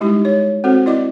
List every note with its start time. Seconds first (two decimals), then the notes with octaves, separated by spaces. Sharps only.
0.01 G3 G#3 D#4 E4 G4
0.25 C#5
0.64 C4 F#4 A4 C5
0.86 E4 D5 D#5 D6